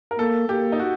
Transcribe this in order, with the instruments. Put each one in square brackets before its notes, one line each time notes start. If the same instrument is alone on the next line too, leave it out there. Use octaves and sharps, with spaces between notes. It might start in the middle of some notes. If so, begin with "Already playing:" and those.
[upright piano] A#4
[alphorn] A#3 [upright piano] A4
[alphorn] A#3 [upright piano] G4
[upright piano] D#4
F#4